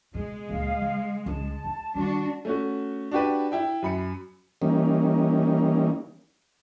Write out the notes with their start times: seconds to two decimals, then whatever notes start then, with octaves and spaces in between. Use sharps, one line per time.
0.14 B2 G#3
0.49 C#2 A#2 F5
0.81 C#3
1.26 C#2 A5
1.64 D#4
1.95 D#3 G3 D4 F#4
2.45 A3 C#4 F#4
3.11 D4 F#4 G4 B4
3.52 E4 G5
3.82 F#2 B5 C#7
4.62 E3 G3 A#3 C#4 D#4